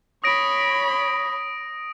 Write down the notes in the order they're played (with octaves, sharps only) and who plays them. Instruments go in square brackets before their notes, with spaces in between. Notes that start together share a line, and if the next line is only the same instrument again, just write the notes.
[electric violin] C#5 B5 [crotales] D#6 A#6 D7